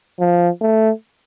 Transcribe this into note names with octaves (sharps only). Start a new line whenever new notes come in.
F3
A3